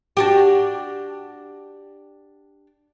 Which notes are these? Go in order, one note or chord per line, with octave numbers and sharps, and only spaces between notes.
D4 F#4 G4